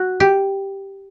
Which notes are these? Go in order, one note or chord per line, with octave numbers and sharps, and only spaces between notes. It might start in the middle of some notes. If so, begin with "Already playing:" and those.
Already playing: F#4
G4